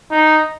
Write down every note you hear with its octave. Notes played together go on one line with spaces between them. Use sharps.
D#4